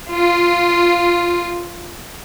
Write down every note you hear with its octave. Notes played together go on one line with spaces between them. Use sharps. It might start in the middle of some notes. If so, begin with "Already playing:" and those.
F4